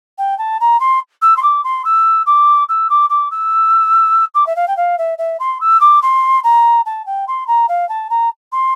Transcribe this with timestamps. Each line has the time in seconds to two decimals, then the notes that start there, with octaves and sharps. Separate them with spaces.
0.18 G5
0.38 A5
0.60 A#5
0.80 C6
1.22 E6
1.36 C6
1.42 D6
1.64 C6
1.85 E6
2.26 D6
2.69 E6
2.90 D6
3.10 D6
3.31 E6
4.34 D6
4.46 E5
4.56 F5
4.68 G5
4.77 F5
4.98 E5
5.18 E5
5.40 C6
5.61 E6
5.80 D6
6.02 C6
6.44 A#5
6.86 A5
7.06 G5
7.28 C6
7.47 A#5
7.68 F5
7.89 A5
8.10 A#5
8.52 C6